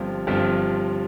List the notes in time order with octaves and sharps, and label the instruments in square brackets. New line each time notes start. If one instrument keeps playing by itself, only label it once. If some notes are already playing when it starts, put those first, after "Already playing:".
Already playing: [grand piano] G1 G2 F3 C4 F4
G1 G2 F3 C4 F4